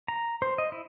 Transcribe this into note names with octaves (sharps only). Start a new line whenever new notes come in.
A#5
C5
D#5
E4